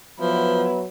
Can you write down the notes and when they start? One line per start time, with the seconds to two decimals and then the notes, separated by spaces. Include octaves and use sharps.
0.20 F3 F#3 B3 E4 B4